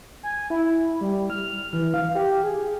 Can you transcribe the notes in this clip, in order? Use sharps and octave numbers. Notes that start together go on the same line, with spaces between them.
G#5
E4
G3
F6
E3
F5
G4
G#4